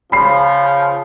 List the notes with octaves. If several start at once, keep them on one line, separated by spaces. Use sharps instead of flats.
C#3 F3 B5 C7